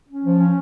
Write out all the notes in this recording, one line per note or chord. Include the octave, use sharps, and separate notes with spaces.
C#4
F3
C#4